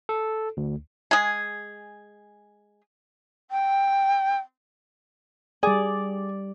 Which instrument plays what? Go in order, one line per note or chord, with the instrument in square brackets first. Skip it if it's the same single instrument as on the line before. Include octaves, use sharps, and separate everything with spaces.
[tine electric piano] A4
D2
[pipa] G#3 G#4
[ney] G5
[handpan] G3 D5 [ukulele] G#4